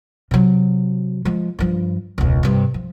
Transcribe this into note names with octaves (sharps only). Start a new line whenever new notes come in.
C3 F#3
F3 G#3
G2 F3
E1 C#2
G2 C3
F3